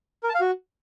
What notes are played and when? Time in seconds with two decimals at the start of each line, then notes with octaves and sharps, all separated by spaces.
0.23 A#4
0.29 A5
0.35 F5
0.40 F#4